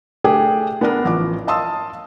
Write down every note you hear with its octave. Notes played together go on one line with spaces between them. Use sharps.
A3 D4 G4 G#4 G5
B3 D4 A#4
A1 F3 D6
D#5 F5 A5 C6 D#6 E6